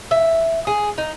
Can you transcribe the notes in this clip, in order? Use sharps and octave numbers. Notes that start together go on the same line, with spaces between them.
E5
G#4
D#4